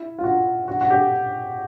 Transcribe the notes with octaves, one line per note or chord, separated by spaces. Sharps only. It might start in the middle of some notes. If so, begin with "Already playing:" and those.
Already playing: E4
F4
F#4
F#4
F#4
G4